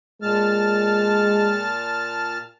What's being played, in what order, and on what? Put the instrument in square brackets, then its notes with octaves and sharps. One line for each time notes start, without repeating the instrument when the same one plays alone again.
[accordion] A#2 A5 F6 [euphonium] G#3